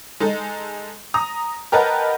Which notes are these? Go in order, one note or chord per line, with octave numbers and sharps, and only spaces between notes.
G#3 D#4 A4
A#5 D#6
G4 A#4 B4 D#5 F#5 A5